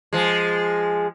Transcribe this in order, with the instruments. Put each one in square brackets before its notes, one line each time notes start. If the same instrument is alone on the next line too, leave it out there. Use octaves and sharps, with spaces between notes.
[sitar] F3 G#3